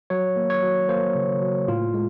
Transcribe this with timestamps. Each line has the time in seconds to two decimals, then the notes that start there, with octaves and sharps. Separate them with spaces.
0.10 F#3 C#5
0.36 A#3
0.50 C#5
0.63 F#3
0.88 A#3 C5
1.15 C#3
1.42 F#3
1.68 A2 F4
1.94 G#3